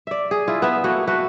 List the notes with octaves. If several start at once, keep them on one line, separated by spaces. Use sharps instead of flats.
D5 E5
G#4
E4 F4
B3 E5
A3 A#3 F#4
A3 F#4 B4